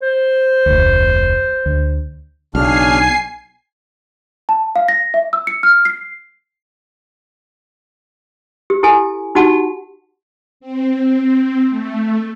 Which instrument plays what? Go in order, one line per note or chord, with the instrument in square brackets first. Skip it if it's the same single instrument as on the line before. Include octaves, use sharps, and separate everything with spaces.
[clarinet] C5
[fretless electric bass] F1 D2
D2
[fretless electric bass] B1 [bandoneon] C#3 D4 F6 [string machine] G#5 C7
[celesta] A5
F5
A#6
E5
E6
C#7
F6
C7
[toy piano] G4
E4 G4 A4 G#5
D#4 F#4 G4 F#5 A5
[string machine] C4
A3